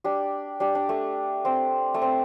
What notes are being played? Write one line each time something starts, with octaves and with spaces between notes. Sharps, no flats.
D4 G4
D4 G4
D4
A3
C4
A3
C4